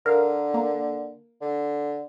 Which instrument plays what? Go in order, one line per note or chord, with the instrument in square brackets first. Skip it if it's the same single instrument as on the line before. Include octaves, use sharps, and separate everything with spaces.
[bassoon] D3 [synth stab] A#4 F5
[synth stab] A#3
[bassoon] D3